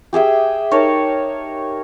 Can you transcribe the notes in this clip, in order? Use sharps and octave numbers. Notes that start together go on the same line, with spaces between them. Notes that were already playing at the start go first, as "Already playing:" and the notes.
G4 G#4 E5 G5
D#4 A#4 C#5 A5